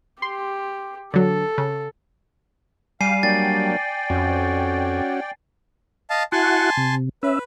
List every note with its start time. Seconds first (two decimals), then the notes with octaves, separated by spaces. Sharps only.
0.22 G4 C6
1.14 D3 F#3 A4
1.58 C#3
3.01 G3 F5 G#5 C7 D#7
3.23 F#3 A#3 D4 D5 G5 A6
4.10 F2 C#4 F#4
6.09 D#5 F5 A5
6.32 E4 F#4 F#5 G#5 A5 C6
6.77 C3
7.23 C#4 B4 E5